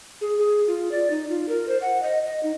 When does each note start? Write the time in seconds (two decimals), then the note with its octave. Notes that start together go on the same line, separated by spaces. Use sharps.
0.21 G#4
0.38 G#4
0.68 F4
0.91 D5
1.10 D#4
1.30 F4
1.49 A#4
1.68 C5
1.82 F#5
2.03 D#5
2.26 D#5
2.43 D#4